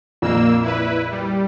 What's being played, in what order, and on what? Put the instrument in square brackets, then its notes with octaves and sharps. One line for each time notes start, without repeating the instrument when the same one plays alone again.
[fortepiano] A#1 F2 A#2 [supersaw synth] A#3 E6
[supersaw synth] E4 B4
G3